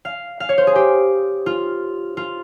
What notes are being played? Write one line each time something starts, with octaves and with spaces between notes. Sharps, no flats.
F5
F5
C#5
C5
G#4
G4
F4
F4